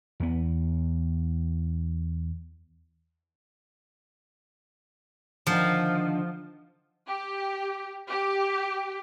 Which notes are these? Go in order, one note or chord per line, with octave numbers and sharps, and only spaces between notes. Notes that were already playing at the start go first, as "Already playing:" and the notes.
E2 B3
D3 D#3 F3
G4
G4